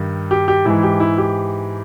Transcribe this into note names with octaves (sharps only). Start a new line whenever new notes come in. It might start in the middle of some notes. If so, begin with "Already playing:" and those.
Already playing: G2 D#3
G4
G4
G#2 E3 E4
G4
E4
G4